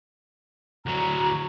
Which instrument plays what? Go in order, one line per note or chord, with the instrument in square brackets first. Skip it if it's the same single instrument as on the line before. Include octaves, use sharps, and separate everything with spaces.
[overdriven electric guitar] D2 F#3 [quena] A#5